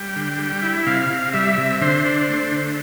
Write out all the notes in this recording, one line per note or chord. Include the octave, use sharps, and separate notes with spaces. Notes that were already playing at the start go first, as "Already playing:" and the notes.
Already playing: G3 G5
D3
G3
E4
C3 F5
C3
G3 E5
C3
D3 C5
D4
A3
D3